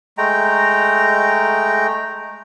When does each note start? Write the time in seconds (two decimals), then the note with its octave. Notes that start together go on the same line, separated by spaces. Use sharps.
0.18 G#3 A3 G5 A#5